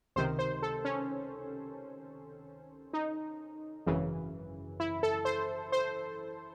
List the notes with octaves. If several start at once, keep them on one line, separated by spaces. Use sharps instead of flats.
C#2 C3 D#3 C5
C5
A4
C#4
D#4
G#1 F#2 C#3 E3
E4
A4
C5
C5